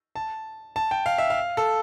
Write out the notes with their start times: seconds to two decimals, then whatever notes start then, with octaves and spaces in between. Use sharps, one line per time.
0.16 A5
0.76 A5
0.91 G5
1.06 F5
1.18 E5
1.30 F5
1.57 A4